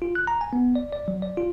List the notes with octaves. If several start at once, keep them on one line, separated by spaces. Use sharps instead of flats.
F4
F#6
A#5
G#5
B3
D5
D5
F#3
D5
F4